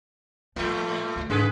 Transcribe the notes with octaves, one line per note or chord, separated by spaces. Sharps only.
A2 F3 G3 A3
D2
G#2 C#3 G#4 B4